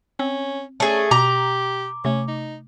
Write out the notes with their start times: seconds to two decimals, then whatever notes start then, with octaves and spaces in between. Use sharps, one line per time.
0.19 C4 C#4
0.80 A3 C#4 G#4
1.11 B2 G4 A#5 D6
2.05 C3 A3 C#4
2.28 D#4